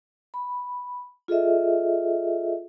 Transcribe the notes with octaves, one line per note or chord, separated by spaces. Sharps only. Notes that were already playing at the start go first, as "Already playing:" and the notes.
B5
F4 G#4 A4 D#5 E5